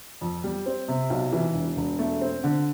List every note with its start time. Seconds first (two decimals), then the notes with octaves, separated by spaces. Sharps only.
0.21 F2
0.44 G3
0.66 C4
0.88 C3
1.10 B1
1.33 E3
1.54 E1
1.77 E1
1.99 A3
2.21 C4
2.44 D3